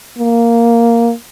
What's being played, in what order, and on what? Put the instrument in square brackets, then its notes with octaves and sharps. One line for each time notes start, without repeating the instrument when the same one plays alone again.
[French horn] A#3